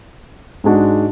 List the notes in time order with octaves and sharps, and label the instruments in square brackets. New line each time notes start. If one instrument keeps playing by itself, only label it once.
[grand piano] G#2 G#3 D4 F#4